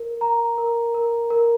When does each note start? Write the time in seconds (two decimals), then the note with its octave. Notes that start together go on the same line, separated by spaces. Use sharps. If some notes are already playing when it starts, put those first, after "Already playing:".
Already playing: A#4
0.21 A#5
0.58 A#4
0.94 A#4
1.30 A#4